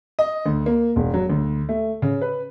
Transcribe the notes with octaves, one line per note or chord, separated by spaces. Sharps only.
D#5
D2
A#3
E1
F#3
D2
A3
C#3
B4